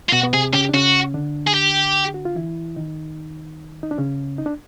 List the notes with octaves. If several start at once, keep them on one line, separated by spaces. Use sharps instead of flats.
F4
B2 B3 F#4
B3
C3 C4 G#4
C#3 C#4 G4
D4
C#3 C#4 F#4
D3 D4
G#4
G4
F#4
F4
E3 E4
D#3 D#4
D#4
D4
C#3 C#4
D#4
D4